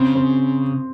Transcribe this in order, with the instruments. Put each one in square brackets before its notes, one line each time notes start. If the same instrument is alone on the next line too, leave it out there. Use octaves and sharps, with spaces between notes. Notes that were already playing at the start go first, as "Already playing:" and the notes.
Already playing: [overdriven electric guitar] C#3 [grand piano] C4
[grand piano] C4